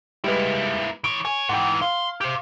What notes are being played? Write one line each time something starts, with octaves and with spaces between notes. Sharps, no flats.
G3 G#3 A#3 E4 B4
E3 C#5 D7
C#5 G#5
G#2 E3 F#5 G5
F5 C6
G4 C5